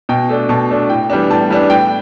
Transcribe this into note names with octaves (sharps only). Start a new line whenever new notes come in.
B2 G5
A3 D4
B2 A5
A3 D4
A2 G5
E3 G3 B3 D4
A2 A5
E3 G3 B3 D4
A2 G5